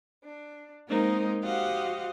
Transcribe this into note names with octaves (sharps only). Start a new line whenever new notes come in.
D4
G#3 A#3 C4 D#4 A#4 C5
F#4 G4 C5 D#5 F5 F#5